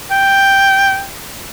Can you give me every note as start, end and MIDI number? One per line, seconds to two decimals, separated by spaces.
0.11 1.04 79